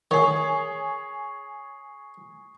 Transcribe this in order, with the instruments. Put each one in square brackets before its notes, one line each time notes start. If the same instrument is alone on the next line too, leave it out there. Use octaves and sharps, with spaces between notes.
[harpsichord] D#3 [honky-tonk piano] G#4 C#5 [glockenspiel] C#6 D#6 C7